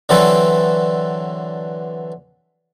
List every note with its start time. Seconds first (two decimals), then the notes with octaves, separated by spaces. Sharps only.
0.09 D3 E3 F#3 C4 A4 B4